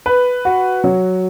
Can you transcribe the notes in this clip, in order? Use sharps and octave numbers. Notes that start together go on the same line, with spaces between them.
B4
F#4
F#3